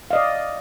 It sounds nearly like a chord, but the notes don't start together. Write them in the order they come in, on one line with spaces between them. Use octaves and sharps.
F5 D#5 D5